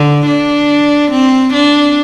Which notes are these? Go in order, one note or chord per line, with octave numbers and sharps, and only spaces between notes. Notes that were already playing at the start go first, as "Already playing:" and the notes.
Already playing: D3
D4
C4
D4